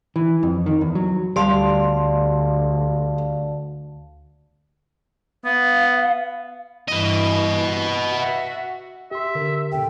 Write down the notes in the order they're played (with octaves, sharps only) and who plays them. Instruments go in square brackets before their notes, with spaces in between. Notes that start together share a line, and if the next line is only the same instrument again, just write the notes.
[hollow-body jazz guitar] E3
F2
D#3
E2
F#3
[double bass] D2 [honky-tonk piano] G3 C6 [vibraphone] D5 F5 A5
[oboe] B3 [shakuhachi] F5
[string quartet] G2 E3 [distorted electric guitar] B4 D#5
[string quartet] F#4 E5
[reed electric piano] G4 C6 [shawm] E5
[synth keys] D3 A#4
[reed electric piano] E2 A#2 C#3 [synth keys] A4 [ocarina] G5